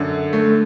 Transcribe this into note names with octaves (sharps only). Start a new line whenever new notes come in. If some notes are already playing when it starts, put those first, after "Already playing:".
Already playing: F#2 D3
A3